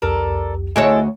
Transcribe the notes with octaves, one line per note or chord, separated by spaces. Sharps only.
C2 F2 G4 A4 A#4 D5
D2 G#3 E4 F#4 A4 C#5 F#6